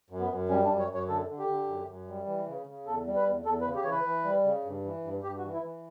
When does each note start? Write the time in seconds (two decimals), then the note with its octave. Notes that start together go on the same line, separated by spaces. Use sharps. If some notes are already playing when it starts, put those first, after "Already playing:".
0.10 F#2
0.20 B3
0.30 F#2
0.49 G3 C#4
0.64 D4
0.70 F#2
0.79 C#5
0.89 F#2 C#5
1.08 D3 A4
1.28 D3
1.39 G4
1.48 D3
1.67 F#2
1.87 F#2
2.08 G3
2.27 E3
2.47 C#3
2.67 C#3
2.86 E2 A4
3.07 G3
3.16 B4
3.25 E2
3.45 E2 A4
3.61 B4
3.66 C#3
3.76 G4
3.84 E3 C#5
3.91 B4
4.04 E3
4.24 G3
4.44 C#3
4.64 G2
4.85 E3
5.04 G2
5.23 G2 G4
5.38 F#4
5.44 E3
5.53 E4
5.64 E3